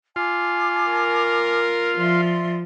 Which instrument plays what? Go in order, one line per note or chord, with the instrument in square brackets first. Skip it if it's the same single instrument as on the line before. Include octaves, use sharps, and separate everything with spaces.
[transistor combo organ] F4 [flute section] G#5 A5 D6
[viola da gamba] A#4
[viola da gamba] F3 [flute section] D5 E5 C6